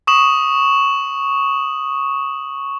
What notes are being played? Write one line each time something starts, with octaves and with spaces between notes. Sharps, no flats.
C#6 D#6 E7 F#7